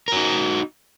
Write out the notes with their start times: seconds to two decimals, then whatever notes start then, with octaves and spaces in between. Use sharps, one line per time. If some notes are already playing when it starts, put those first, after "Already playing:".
0.08 A#4
0.12 F#4
0.16 D#4